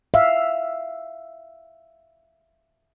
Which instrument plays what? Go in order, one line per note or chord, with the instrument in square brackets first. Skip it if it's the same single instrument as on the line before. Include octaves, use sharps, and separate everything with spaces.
[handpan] E5 F5